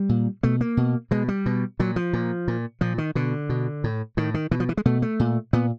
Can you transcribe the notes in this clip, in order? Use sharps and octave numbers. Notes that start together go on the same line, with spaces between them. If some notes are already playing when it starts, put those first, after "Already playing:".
Already playing: G3
A#2
B2 A3
A#3
B2
B2 G#3
G3
B2
A#2 F#3
F3
A#2
A#2
A#2 F3
D#3
B2 D3
B2
A2
A2 D#3
D#3
B2 E3
F3
E3
G#3
B2 A3
A3
A#2
A#2 B3